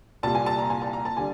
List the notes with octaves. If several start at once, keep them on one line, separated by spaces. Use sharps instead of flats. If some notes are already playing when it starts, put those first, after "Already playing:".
C2 A#2 G3 A5
G#5
A5
A#5
G#5
A5
A#5
A5
D3 G3 G#5